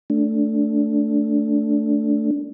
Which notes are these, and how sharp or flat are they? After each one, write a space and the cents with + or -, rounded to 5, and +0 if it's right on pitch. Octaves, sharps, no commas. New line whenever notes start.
A3 +0 D4 -15